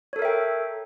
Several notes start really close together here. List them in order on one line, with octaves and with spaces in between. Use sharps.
C#5 A4 A#4 E5 G5